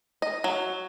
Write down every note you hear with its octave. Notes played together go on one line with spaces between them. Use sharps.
D#5
F#3